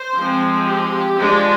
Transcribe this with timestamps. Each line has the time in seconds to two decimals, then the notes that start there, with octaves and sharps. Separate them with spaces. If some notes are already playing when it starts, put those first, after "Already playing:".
Already playing: C5
0.16 F3 G#3 C4
0.67 G4
1.18 F3 G#3 D4